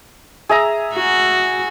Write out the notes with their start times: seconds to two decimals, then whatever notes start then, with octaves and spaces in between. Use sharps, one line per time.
0.49 G#4 E5 A#5
0.95 F#4